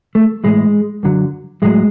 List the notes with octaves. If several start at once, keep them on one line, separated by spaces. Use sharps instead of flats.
A3
A2 E3 G#3
F#2 D3 F#3
A2 F#3 G#3